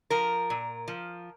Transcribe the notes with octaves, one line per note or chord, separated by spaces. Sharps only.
F3 A#4
A#2
F3